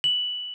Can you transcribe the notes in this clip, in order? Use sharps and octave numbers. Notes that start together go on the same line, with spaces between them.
F#7